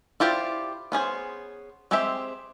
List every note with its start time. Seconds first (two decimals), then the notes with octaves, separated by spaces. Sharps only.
0.20 E4 F4 G4 C5 D5
0.92 B3 C#4 G#4 C5
1.91 G#3 C4 G4 C5 E5